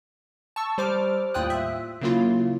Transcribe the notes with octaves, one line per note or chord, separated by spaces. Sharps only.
A5 C#6 E6
G3 C5 D6 F6
D#2 A2 F4 G5 D#6 F#6
E5
C#3 F#3 A#3 E4 F4